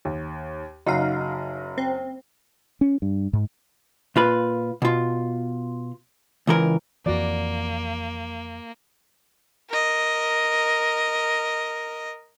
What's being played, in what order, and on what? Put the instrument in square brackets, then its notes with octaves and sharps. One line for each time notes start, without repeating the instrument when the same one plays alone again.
[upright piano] D#2
[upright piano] F#1 F#4 [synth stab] D#4 F5
[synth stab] C4
[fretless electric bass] C#4
G2
G#2
[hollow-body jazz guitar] A#2 F4 B4
B2 F4
C#2 E3 A#4
[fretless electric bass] F2 E3 [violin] A#3 [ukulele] F#4 D5
[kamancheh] A#4 D#5